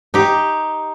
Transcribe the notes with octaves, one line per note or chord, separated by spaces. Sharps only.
D#4 G4